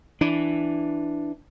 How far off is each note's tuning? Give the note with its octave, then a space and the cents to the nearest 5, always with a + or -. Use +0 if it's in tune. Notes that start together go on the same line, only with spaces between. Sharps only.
E3 +0 D4 +0